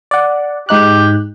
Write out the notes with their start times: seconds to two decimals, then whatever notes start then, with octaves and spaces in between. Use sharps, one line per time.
0.11 D5 F#5
0.69 G#2 D#4 G4 F#6